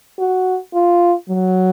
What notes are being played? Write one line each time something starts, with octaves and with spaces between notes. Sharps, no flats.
F#4
F4
F#3